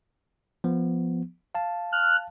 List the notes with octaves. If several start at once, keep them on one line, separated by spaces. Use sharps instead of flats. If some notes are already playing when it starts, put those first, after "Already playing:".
F3 B3
F5 A5
F6 F#6